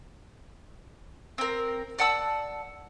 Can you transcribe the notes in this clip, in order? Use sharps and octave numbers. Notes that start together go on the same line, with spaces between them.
C4 A#4
D5 F#5 A5 E6